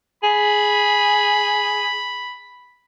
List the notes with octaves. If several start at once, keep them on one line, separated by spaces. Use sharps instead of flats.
G#4 B5